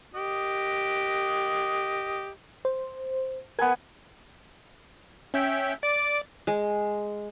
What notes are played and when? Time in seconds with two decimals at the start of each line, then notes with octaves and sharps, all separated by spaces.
0.15 G4 D#5
2.65 C5
3.59 B3 A#4 G#5
5.34 C#4 E5 G5
5.83 D5 D7
6.47 G#3